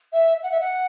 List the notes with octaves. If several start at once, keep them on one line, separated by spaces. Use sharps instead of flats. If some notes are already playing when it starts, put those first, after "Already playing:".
E5
F#5
E5
F#5